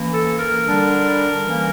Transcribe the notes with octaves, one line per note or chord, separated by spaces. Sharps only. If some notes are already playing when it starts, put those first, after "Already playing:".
Already playing: E3 A#3 C#4
A4
A#4
D3 G3 D4
E3 G3 A#3 C#4